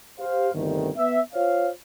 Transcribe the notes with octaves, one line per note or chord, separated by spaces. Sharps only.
G4 C5 F5
G1 D2 C3 D#3
B3 E5
F4 C5 C#5 F5